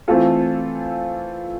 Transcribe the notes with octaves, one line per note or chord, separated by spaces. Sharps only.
E3 A3 C4 F4 A4